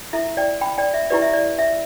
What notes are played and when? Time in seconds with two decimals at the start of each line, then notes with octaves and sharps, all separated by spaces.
0.13 E4 A4 E5
0.37 D5 G5
0.61 G5 B5
0.78 D5 G5
0.94 E5
1.10 E4 G4 B4 D5
1.22 E5
1.33 D5
1.59 E5